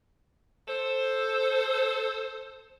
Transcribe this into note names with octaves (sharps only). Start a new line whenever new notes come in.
A4 C5